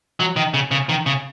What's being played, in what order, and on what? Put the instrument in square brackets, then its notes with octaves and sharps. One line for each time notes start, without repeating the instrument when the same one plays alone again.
[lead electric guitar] F#3
D#3
C#3
C#3
D#3
C#3